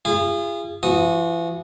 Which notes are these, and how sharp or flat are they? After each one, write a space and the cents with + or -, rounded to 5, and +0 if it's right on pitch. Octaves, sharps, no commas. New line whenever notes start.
F4 -35 G#4 -30
E3 +40 F#4 -30 D#6 +0